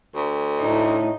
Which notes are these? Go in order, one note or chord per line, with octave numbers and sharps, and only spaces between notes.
D2
A2 D#4